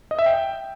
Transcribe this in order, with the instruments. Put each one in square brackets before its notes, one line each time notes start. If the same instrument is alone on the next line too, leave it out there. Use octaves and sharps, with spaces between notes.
[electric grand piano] D#5
E5
G5